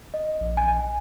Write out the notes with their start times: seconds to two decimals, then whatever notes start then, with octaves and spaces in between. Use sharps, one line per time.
0.14 D#5
0.40 A#1
0.57 G#5